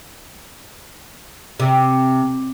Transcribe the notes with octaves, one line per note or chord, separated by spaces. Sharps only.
C3